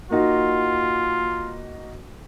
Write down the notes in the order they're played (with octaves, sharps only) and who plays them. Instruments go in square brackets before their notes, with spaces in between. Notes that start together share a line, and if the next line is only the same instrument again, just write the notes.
[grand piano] A#3 D#4 F#4 [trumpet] F4